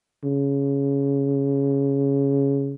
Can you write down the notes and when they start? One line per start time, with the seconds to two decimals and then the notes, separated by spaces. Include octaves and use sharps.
0.24 C#3